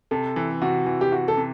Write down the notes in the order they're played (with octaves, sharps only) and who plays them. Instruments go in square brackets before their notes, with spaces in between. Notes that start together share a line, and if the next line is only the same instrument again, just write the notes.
[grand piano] C3 [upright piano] A4
[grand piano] E3
[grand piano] C3 [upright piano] F#4
[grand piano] E3
[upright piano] G4
[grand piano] C3 [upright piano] F#4
[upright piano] A4
[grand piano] C3